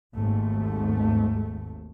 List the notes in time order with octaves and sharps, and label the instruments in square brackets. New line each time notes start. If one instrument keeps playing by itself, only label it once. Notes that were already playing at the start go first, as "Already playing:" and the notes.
[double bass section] G#1 D#2 G#2 A3